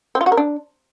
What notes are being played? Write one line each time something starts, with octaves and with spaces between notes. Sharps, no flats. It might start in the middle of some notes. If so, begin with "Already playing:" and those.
C4
F4
F#4
A#4
D4